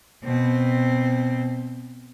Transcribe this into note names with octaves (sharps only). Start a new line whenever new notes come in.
B2 C4